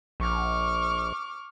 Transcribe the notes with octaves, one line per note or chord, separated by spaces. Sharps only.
A#1 C#6 D6 F6